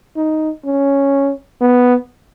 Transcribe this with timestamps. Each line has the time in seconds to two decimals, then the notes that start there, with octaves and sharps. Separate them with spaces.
0.16 D#4
0.65 C#4
1.61 B3